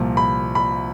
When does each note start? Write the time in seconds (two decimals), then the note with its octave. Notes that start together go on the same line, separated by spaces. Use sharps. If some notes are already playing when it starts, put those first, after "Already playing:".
Already playing: C2 A#2 F3
0.17 B5
0.55 B5